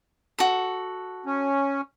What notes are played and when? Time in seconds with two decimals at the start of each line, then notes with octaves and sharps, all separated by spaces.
0.39 F#4 A4
1.26 C#4